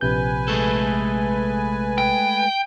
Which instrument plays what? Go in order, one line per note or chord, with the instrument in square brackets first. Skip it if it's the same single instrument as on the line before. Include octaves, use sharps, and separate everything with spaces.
[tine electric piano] A#1 C3 G6 [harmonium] B4 G#5
[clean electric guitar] G#3 A3 A4
[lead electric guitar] G5